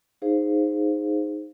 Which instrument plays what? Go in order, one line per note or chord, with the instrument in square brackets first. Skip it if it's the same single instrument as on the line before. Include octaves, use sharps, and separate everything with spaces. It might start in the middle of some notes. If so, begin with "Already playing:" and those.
[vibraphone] D#4 G#4 C5 F5